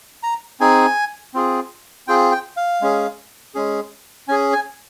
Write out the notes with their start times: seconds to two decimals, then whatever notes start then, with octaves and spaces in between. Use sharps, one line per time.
0.23 A#5
0.60 C4 D#4 G#4 G#5
1.34 C4 F4 G#4
2.08 C4 F4 G#4 G5
2.32 G5
2.57 F5
2.81 G#3 C#4 G#4
3.55 G#3 C#4 G#4
4.28 C#4 G#4 G#5
4.53 G#5